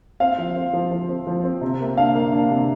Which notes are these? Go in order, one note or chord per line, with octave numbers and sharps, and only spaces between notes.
C4 F5
F3
C4
F3
F3
C4
F3
C4
C3
A#3
D4 F5
A#3
D4
C3